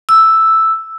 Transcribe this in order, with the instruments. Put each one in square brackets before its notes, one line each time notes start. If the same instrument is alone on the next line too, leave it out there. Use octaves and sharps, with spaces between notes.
[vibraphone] E6